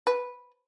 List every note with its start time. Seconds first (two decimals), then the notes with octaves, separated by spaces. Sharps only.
0.07 B4